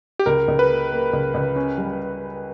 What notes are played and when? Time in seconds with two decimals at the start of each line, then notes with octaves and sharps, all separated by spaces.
0.19 G4
0.26 C#2 A#4
0.48 C#2
0.59 B4
0.69 A#3
0.91 A#3
1.13 C#2
1.34 C#2
1.56 C#4
1.78 G3